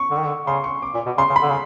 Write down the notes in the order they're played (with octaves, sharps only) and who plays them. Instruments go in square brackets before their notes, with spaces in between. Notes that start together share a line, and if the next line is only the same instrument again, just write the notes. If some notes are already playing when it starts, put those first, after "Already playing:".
Already playing: [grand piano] C#6
[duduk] D3
D#3
D3
[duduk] C#3 [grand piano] C6
[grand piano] C#6
D6
[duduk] A#2
B2
[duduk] C#3 [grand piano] C6
[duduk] C#3
[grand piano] B5
[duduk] D3
C#3